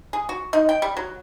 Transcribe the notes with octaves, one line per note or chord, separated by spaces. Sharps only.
G#4
F#4
D#4
G5
G3
F#3